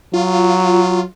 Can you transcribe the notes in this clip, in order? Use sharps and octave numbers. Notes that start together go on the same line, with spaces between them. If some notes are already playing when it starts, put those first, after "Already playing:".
F#3 F4